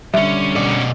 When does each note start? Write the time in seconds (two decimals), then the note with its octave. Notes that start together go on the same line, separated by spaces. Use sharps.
0.14 B1 D3 G3 C#4 E5
0.56 B2 D5